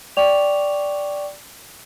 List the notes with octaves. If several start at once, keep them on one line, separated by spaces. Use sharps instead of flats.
D5 G5 C#6 D6 F7